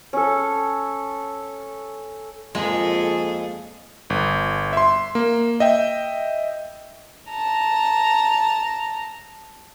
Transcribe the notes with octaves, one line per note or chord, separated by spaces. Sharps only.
C#4 A4
F2 A#2 G#3 G#4 A4
G1
E5 C6
A#3
D#5 E5 G5
A5 A#5